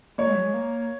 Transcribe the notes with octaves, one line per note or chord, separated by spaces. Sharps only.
A#3 C#5
G#3
F#3
G#3
A#3